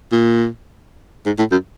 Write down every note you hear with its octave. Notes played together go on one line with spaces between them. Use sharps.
A#2
G#2
A2
F#2